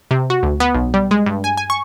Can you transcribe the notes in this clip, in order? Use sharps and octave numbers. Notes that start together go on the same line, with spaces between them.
C3
F#4
D2
B3
B1
G3
G#3
G2
G#5
G#5
C#6